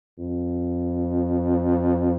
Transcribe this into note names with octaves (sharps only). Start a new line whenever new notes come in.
F2